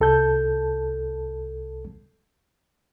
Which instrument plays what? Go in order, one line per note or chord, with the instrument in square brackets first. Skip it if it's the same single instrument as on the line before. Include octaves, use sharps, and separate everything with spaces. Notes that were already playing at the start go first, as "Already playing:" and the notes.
[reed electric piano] C2 A4 A5 G6